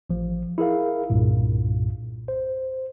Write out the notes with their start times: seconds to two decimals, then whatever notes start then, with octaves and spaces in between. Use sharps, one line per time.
0.10 A1 F3
0.58 E4 G#4 A#4 F5
1.10 C2 G2 A#2
2.28 C5